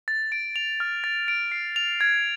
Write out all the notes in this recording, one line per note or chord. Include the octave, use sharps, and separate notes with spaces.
A6
D7
F7
F6
A6
D7
C7
F7
G#6